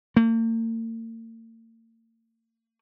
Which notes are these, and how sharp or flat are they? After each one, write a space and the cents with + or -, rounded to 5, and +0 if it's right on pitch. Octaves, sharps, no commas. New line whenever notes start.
A#3 -45